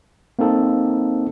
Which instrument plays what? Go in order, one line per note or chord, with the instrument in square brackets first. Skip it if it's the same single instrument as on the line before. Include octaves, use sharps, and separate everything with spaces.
[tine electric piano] A#3 C4 D#4 A4